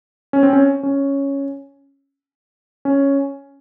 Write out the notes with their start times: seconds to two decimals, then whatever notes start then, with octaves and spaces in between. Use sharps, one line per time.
0.33 C#4
0.43 C4
0.53 C#4
0.83 C#4
2.85 C#4